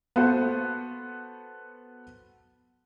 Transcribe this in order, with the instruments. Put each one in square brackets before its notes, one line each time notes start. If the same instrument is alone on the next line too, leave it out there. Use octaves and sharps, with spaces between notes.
[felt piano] B3 F#4 A4 C5 F#5